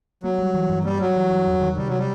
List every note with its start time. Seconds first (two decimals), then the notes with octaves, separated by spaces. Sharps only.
0.23 F#3 A#3
0.38 G3
0.54 E3
0.69 G2
0.84 G3 A#3
1.00 F#3 G3
1.16 E3
1.31 G2
1.47 E2
1.61 D#3
1.77 C3 G3
1.88 F#3
1.99 G3